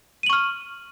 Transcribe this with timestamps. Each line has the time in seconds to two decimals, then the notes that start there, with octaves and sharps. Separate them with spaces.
0.23 D#7
0.26 F#7
0.30 C#6
0.33 F6